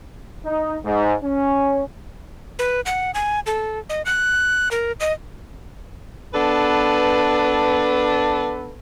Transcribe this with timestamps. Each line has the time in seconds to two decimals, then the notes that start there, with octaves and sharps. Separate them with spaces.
0.45 D#4
0.86 G#2
1.23 C#4
2.59 B4
2.86 F#5
3.14 G#5
3.46 A4
3.89 D#5
4.06 F#6
4.71 A#4
5.00 D#5
6.34 B3 D4 A4 B4